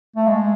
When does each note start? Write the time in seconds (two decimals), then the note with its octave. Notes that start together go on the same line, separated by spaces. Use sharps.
0.16 A3
0.27 G#3